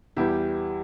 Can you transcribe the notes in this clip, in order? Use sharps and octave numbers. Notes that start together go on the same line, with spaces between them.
E2 E3 G3 E4 G4